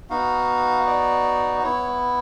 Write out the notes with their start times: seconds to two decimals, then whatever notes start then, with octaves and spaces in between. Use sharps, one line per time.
0.10 B3 D#4 F#4 F5
0.87 D5
1.63 B3 E4 C#5